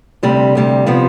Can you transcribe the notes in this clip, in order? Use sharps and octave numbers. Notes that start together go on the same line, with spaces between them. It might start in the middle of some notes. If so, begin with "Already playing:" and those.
D2 C3 G3
D2 C3 G3
C3 F3 B3